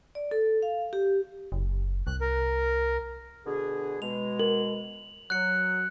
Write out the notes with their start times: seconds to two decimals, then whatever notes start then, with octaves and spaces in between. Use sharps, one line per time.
0.15 D5
0.31 A4
0.62 F5
0.93 G4
1.52 F#1
2.07 C2 F#6
2.21 A#4
3.46 B2 D3 G#4
4.02 B2 G#3 F7
4.40 A#4 F#7
5.30 F#3 F#6 C#7